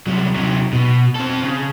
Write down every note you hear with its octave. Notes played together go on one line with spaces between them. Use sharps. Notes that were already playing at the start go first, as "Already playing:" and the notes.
C2 F#3
C3 F#3
B2
C4 A4
C#3